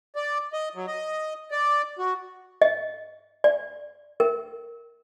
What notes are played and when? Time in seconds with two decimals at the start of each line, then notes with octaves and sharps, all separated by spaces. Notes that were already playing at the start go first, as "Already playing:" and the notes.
0.16 D5
0.53 D#5
0.75 F#3
0.88 D#5
1.51 D5
1.99 F#4
2.62 D#5
3.44 D5
4.20 A#4